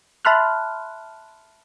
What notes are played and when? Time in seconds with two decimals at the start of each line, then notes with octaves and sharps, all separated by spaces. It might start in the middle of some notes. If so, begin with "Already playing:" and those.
0.25 E5 A5 B5 C6 F6 F#6